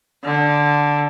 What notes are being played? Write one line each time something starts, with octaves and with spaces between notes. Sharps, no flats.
D3